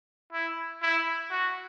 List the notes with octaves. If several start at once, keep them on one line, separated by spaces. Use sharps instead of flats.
E4
E4
F#4